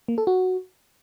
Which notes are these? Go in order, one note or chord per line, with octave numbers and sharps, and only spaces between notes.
A#3
A4
F#4